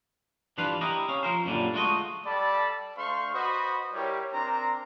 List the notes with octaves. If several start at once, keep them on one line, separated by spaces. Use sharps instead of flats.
G2 E3 D4 F4 B4 F5
E4 G4 A#4 D#5
C#4 F5
F3 A#4 C5
F#2 A#2 D3 G3
G#3 A3 F4 F#4 D5 D#5
G3 A4 D5 G5 A5 B5
A3 D4 C5 F5 C6 C#6
F#4 B4 C5 D#5 B5 D#6
G3 E4 G4 A#4 C#5
C4 D4 A#4 C5 A#5